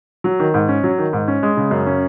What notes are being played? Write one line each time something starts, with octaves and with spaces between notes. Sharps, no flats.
F#3
D#3
G#2
C#4
F#3
D#3
G#2
C#4
G#3
C#3
F#2
C#4